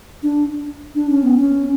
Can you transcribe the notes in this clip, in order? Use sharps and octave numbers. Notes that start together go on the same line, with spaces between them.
D4
D4
C#4
B3
C#4